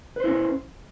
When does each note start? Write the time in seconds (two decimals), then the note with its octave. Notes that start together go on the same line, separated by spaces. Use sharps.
0.16 B4
0.20 C5
0.24 E4
0.28 C#4